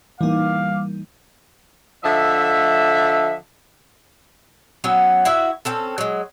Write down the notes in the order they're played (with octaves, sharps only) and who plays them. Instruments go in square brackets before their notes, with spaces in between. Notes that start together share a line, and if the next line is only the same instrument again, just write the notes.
[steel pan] E3 A#3 [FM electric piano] G3 D#4 [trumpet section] F5 D6
[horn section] D3 F3 D#5 E5
[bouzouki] F#3 B3 C#4
E4 F#4 E5
C4 C#4 A4
F#3 G#3